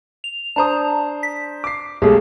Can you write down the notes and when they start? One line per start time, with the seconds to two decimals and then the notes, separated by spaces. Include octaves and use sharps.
0.24 F7
0.56 D4 C5 A5 A#5 D#6
1.23 B6
1.64 D6 C7
2.02 B1 G#3 A3 G4 G#4